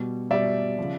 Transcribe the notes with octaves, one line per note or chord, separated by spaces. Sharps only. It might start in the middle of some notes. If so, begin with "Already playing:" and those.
Already playing: B2 G3
B2 G3 D5 E5
C#3 F3